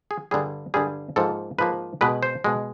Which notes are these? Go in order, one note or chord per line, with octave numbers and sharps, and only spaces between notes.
G#4
G2 D3 G3 G#4
G2 D3 G3 G#4
G#2 F3 A#3 A4
G#2 F3 A#3 B4
B2 G#3 B4
C5
B2 G#3